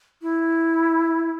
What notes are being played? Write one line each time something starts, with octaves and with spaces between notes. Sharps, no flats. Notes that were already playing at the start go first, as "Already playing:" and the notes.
E4